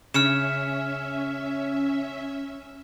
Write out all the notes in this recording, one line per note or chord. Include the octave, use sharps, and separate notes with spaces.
C#3 C#4 E5 F6 C#7 E7